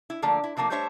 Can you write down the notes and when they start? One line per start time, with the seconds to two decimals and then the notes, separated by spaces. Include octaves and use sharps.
0.10 E4
0.22 D3 F3 A3 A#3 D5
0.44 E4
0.57 C3 F3 A3 A#3 D4
0.70 G3 A3 D4 C5 C#5 E5